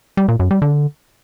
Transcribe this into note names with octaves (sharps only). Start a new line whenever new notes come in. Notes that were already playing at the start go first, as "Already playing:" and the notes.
G3
A#2
F#2
G3
D3